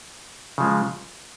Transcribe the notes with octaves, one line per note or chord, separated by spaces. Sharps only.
C#3 F3 G#3